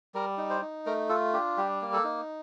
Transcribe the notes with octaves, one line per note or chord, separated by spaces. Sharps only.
G3 A#4
D#4
C5
D#4
A3 A#4
F4 A4
D4 G4
G3 G4
A#3
A4
D#4